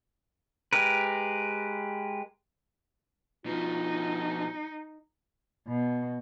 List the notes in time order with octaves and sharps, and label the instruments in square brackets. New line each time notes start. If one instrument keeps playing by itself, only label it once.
[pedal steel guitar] G#3 G4 A#4 B4
[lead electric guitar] B2 F3 [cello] D#4 [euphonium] F4
[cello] B2